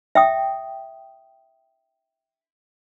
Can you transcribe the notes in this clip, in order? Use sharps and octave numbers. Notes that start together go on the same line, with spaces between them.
E5 G5 D#6